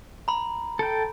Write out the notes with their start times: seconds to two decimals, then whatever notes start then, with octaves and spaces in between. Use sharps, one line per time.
0.28 A#5 B5
0.79 A4 G5